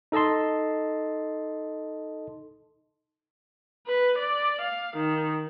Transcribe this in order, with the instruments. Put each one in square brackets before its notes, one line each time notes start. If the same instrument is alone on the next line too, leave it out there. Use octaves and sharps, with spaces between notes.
[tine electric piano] D#4 A4 D#5 A5 C6
[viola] B4
D5
F5
D#3